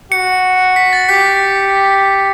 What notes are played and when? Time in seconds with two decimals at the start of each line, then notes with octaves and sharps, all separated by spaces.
0.12 F#4 C#7
0.76 B6
0.93 A6
1.09 G4 B6